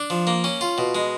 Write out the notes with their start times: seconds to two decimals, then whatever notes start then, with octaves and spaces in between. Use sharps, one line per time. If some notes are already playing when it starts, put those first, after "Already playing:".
Already playing: D4
0.10 F3
0.27 A#3
0.44 C#4
0.61 F4
0.78 B2
0.95 G#3